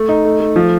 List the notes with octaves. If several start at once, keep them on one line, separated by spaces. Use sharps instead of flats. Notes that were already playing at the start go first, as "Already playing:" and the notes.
Already playing: A3
D#4
A3
A3
F3